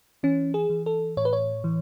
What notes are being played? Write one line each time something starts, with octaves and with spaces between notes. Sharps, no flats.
E3 C#4
G#4
E3
A4
A2 C#5
B4
C#5
E3